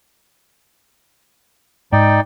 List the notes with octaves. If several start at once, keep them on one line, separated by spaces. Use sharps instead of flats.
G#2 D#4 D5 G5